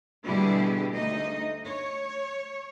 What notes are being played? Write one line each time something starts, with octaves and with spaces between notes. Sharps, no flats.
B2 D3 G3 E4 G4 G#4
D2 D#4 D#5
C#5